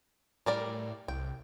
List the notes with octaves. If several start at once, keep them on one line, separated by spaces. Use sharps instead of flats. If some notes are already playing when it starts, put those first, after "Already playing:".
A2 G3 A#4 D5
C2 G5